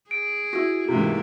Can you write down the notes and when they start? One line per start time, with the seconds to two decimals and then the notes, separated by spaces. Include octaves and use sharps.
0.11 G#4 D7
0.53 E4 F#4
0.89 G#2 C3 E3 A3 A#3